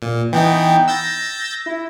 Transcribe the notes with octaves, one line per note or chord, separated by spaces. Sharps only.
A#2
E3 B3 D#4 G5
E6 G6 A6 A#6
E4